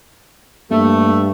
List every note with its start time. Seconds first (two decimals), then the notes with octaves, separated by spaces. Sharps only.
0.71 G2 A3 A#3